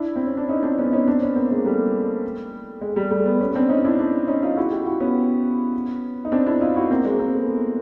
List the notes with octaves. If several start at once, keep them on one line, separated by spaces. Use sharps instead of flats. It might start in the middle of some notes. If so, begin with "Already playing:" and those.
Already playing: D4 E4
C4
C#4
D4
C#4 D#4
C4 D4
B3 C#4
C#4 D#4
C4 D4
B3 C#4
A#3 C4
G#3 A#3
G3 A3
G#3
G3
G3 A3
A3 B3
B3 C#4
C4 D4
C#4 D#4
D4 E4
D4 E4
C#4 D#4
D#4 F4
E4 F#4
F4 G4
E4 F#4
B3 C#4
D#4
C4 D4
D4 E4
D#4 F4
E4 F#4
A#3 C4
G#3 A#3
A#3 C4
A3 B3